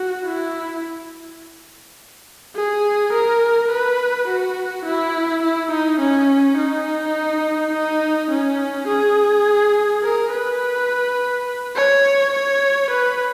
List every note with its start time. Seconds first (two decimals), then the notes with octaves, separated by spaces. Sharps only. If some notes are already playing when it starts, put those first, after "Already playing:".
Already playing: F#4
0.25 E4
2.56 G#4
3.12 A#4
3.70 B4
4.27 F#4
4.85 E4
5.42 E4
5.71 D#4
6.00 C#4
6.57 D#4
7.73 D#4
8.30 C#4
8.88 G#4
10.03 A#4
10.31 B4
11.76 C#5
12.33 C#5
12.90 B4